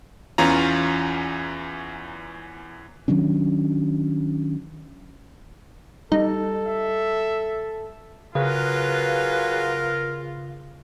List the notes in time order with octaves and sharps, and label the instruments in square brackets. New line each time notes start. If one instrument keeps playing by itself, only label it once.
[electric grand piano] E2 E3 C#4 F4 A#5
[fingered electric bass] D#3 F#3 C#4 D4
[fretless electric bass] G3 [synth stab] D#4 [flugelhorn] A4
[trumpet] E5
[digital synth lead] C#3 [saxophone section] F#3 G#4 B4 [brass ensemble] F4 [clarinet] A#4